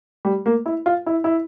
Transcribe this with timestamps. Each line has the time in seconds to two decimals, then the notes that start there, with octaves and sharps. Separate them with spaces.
0.25 G3
0.46 A#3
0.66 E4
0.86 F4
1.06 E4
1.24 E4